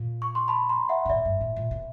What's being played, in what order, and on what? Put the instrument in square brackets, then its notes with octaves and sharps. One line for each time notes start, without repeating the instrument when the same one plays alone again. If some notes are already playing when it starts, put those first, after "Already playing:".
Already playing: [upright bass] A#2
[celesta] C#6
C6
A5 B5
A#5 C6
E5 F#5
[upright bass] A#2
[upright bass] A2 [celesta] D5 E5
[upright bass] G2
A2
A#2
B2